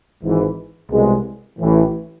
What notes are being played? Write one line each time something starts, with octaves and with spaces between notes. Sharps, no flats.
G#1 G#2 E3
C2 B2 G#3
A1 A2 E3